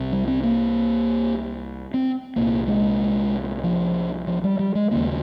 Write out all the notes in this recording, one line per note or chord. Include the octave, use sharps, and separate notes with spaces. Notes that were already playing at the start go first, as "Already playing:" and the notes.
Already playing: C2 C3
G3
C4
A#3
C4
C2 A#2 A#3
G#3
F3
F3
G3
G3
G#3
D#2 C#3 A#3